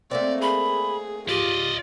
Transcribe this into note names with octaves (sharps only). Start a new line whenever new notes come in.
A3 A#3 C4 D5
G#4 B5
F4 G4 D5 D#5